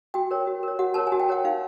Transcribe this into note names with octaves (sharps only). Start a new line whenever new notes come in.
F#4 G5
A#4 C#5
F#4
A#4 C#5
F#4 F#5
A#4 C#5 A5
G#5
F#4
G5
A#4 C#5 F#5
D#4 F5